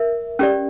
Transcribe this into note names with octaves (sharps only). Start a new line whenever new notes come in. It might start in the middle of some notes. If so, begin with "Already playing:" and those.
Already playing: A#4 E5
C#4 G4 D5